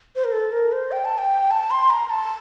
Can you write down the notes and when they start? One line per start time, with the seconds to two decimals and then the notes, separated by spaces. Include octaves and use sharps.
0.16 C5
0.24 A#4
0.32 A4
0.52 A#4
0.72 C5
0.92 G5
1.05 A5
1.18 G5
1.51 A5
1.71 C6
1.90 A#5
2.10 A5